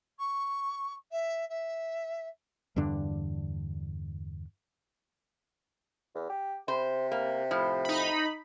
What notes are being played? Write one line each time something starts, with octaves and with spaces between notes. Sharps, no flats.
C#6
E5
E5
E2 G2 D3 D4
E2
G4
C3 C5
A#3
A2 F3
D#4 B5